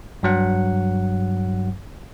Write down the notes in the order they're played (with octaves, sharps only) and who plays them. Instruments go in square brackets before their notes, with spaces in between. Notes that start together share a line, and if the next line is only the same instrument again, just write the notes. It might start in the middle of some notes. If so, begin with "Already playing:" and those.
[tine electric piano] G2 F#3 F#5